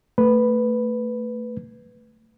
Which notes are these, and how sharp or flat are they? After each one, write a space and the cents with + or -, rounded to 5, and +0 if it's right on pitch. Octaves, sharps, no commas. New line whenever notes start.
A3 +20 B4 +0